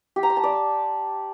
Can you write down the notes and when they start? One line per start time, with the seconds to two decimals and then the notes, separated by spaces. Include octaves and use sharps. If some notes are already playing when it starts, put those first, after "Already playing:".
0.16 G4
0.23 A#5
0.30 C6
0.37 A5
0.44 D5